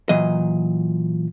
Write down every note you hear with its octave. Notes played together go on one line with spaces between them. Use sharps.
A#2 E3 F#3 D#5